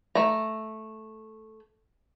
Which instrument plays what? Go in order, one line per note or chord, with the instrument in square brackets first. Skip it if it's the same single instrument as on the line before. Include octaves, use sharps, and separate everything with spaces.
[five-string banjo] A3 A#5